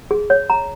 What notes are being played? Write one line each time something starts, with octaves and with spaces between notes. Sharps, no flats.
G#4
C#5
A#5